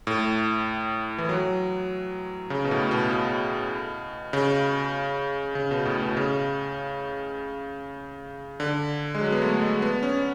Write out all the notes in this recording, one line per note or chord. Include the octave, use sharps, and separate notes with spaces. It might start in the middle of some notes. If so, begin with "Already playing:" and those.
A2
E3
F#3
C#3
B2
A2
B2
B2
C#3
C#3
B2
A2
B2
C#3
D3
G#3
F#3
B3
A3
G#3
B3
C#4